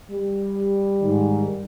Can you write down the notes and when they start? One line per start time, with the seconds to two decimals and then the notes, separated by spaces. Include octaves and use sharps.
0.10 G3
1.00 G#2 D#3